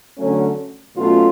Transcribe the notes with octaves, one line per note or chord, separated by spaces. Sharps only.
D3 F#3 A3 C#4
B2 F#3 A3 C#4 F4